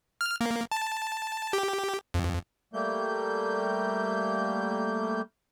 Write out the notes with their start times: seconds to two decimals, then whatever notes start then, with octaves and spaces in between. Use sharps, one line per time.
0.21 F6
0.41 A#3
0.72 A5
1.53 G4
2.14 F2
2.74 G3 A3 A#3 G6